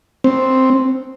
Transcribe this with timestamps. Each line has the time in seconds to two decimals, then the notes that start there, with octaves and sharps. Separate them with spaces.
0.24 C4